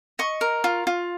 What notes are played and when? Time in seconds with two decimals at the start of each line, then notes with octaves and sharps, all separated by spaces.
0.19 D#5 C#6
0.41 A#4
0.64 F4
0.87 F4